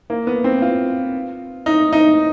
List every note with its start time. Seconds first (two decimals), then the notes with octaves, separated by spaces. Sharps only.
0.10 A#3
0.27 B3
0.44 C4
0.62 F4
1.66 D#4
1.93 D#4